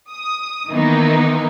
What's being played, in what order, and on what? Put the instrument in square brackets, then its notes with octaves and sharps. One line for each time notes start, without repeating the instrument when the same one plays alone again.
[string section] D#6
D#3 E3 A#3 B3 D#4